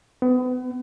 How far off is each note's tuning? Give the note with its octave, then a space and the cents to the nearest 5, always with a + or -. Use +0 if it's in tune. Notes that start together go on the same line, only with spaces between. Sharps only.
B3 +35